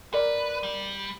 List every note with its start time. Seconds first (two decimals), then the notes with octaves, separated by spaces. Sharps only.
0.13 A#4 B4 D5
0.63 G3